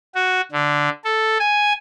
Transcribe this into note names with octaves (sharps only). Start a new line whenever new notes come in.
F#4
D3
A4
G#5